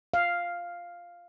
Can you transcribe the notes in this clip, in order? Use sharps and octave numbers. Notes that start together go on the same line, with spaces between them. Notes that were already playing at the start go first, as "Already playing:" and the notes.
F5